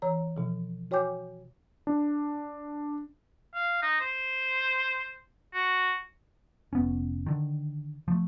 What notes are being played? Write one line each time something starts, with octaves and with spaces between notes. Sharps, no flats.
E3 C#5 A#5
B2 F3
F#4 C#5 G5 G#5 D6 G6
D4
F5
D#4
C5
F#4
F1 B3 C#4
D3 D#3
F3 A3